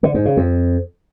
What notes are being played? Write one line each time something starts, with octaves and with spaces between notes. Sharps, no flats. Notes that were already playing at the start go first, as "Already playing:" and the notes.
D3
G#2
C#3
F2